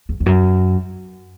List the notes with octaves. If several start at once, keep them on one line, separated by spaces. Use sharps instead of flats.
E2
E2
F#2